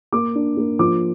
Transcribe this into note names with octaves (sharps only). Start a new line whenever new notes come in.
A#3 D6
D4
A#3
F3 D6